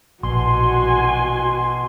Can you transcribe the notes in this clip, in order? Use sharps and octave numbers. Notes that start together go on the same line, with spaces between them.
A#1 B2 F#4 G#5 C6